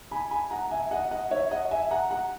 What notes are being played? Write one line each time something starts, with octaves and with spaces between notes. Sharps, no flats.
G#5 B5
G#5 B5
F#5 A#5
E5 G#5
D#5 F#5
D#5 F#5
C#5 E5
D#5 F#5
E5 G#5
F#5 A#5
F#5 A#5